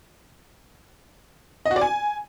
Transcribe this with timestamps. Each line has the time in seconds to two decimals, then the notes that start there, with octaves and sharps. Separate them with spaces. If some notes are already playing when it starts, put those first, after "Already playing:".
1.66 D#5
1.71 F#4
1.76 D5
1.81 G#5